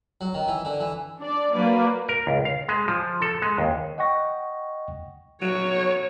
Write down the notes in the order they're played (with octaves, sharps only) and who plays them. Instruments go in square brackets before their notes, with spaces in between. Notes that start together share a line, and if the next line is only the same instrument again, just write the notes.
[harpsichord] F#3
D#3
E3
D3
E3
[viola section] D4 D5
F#3 A#3 B4 D5
[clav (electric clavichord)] A#4
C#2
F5
G#3
F3
A4
G#3
D#2
[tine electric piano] D#5 F#5 G5 C#6 A#6
[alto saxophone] F#3 [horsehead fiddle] C#5